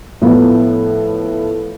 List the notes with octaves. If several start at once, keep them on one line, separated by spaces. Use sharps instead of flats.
A2 F3 B3